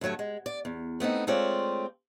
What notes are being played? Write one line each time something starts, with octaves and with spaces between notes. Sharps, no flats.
D2 G2 F#3 A3 C#5
G#3
D5
E2
A3 B3 C4 D#4
G#3 A3 C4 F4 C#5 D5